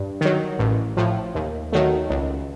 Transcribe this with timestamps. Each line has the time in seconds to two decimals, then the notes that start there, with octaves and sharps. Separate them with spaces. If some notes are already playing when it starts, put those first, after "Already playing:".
Already playing: G2
0.21 D#3 F#3
0.59 A1
0.97 A2 F3
1.35 D#2
1.73 D#3 F#3 A3
2.10 C#2